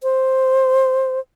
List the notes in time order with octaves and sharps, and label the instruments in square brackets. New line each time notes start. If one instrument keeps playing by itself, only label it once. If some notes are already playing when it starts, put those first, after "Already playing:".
[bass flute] C5